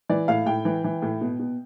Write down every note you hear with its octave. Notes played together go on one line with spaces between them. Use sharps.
E3 D5
A2 F5
A2 G5
E3
E3
A2
B2
B2